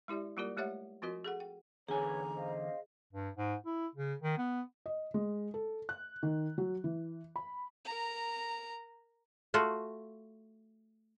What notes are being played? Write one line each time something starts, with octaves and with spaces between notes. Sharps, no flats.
G#3 E4 G4 D5 E5
G3 A#3 F4 G4 A#4 D5
G#3 A3 G4 C#5 E5 F#5
F3 C4 F4 F#4 A#4 D#5
G#4 A4 F#5
G5
E2 D3 G#4 B4 C#5 G#5 A#5
C5 D#5 F5
G2
G#2
E4
C#3
D#3
B3
D#5
G#3
A4
F#6
D#3
F#3
E3
B5
A#4 A#5
A3 F4 F#4